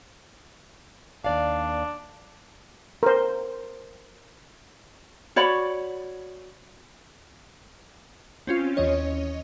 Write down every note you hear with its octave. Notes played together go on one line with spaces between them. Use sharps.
D#2 D4 D5 F5
A#4 C5
F#4 C#5 D5 B5
C4 C#4 F4
D#2 E3 C#4 C#5 D#5